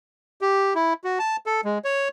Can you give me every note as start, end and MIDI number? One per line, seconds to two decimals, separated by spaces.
0.41 0.74 67
0.75 0.94 64
1.04 1.19 66
1.19 1.37 81
1.46 1.61 69
1.65 1.78 56
1.84 2.08 73